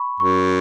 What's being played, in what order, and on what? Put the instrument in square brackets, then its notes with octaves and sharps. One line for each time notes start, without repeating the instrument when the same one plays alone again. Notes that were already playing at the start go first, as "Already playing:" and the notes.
Already playing: [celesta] B5 C#6
[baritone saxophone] F#2 [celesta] C#6